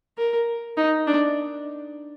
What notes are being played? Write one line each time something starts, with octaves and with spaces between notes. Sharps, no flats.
A#4
D#4
D4